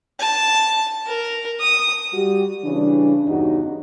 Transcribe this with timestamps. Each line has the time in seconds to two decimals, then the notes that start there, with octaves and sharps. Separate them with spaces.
0.20 A5
1.07 A#4
1.60 D#6
2.13 G3 F#4 G4
2.64 C#3 E3 G3 D4
3.28 E2 G2 C#3 D#4 F#4 G4